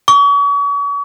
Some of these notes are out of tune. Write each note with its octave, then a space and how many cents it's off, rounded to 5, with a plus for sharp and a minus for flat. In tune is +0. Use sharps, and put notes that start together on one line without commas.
C#6 +40